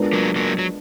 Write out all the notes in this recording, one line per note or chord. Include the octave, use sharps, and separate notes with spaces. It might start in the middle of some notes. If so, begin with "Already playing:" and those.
Already playing: G#3 B3 D4 F4 A#4
F#3 A#3
F#3 A#3
F#3